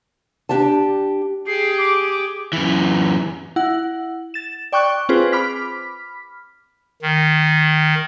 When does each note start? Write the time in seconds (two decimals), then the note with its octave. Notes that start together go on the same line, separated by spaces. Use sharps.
0.49 D4 G4 G5 A5
1.47 G4 G#4 C7
1.78 D6
2.53 F#2 E3
3.56 E4 F#5
4.34 A6 E7
4.72 D5 G5 C#6 D6 F#6
5.09 C4 F4 G#4 B4 C5
5.32 B5 D6 F6 B6
7.02 D#3